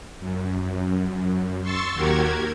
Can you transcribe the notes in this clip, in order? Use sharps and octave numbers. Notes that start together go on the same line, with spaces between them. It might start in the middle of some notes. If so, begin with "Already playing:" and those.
F#2
C6 C#6 E6 A6
D#2 F#4 G4 A#4 G#6